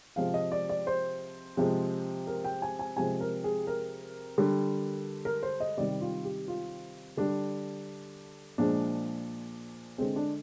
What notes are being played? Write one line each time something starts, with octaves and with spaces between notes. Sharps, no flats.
C3 F3 G#3 F5
D#5
D5
D5
C5
C3 F3 G#3
A#4
G5
G#5
G#5
C3 F3 G#3 G#5
A#4
G#4
A#4
D3 G3
A#4
C5
D#5
C3 D#3 G3 D5
F4
G4
F4
D3 G3 D4
A#2 F3 G#3 D4
D3 G#3 C4
D4